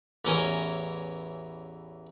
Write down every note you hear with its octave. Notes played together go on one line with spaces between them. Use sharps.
A1 E2 C#4 A#4 D#5 G#5